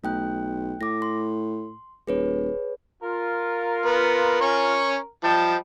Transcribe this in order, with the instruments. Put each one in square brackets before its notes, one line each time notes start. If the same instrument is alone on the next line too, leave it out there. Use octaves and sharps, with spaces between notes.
[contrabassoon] B1 [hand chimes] A3 G5 F#6
[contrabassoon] A2 [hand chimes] D6 A#6
[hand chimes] C6
[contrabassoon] D#1 [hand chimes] G#4 B4 C#5
[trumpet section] F4 [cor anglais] A#4
[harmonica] B3
C#4 C#6
[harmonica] F3 [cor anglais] G3 [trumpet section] D#5 G5 A5